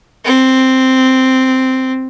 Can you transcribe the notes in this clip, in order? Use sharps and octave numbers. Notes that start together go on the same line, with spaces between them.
C4